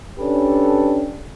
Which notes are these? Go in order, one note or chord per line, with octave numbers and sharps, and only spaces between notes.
C#4 D4 G4 A4 B4